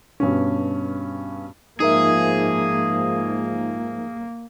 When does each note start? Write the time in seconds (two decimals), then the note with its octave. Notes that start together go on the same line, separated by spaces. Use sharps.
0.20 G2 B2 C#4
1.80 G#2 F3 A#3 D#4 G#4 A#4 E5